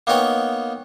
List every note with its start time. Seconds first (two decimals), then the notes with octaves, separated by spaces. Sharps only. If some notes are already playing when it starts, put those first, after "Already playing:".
0.07 A#3 B3 D#4 C#5 G5